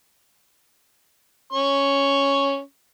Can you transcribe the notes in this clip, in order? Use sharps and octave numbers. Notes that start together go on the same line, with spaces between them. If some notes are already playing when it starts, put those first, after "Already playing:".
C#4 C#6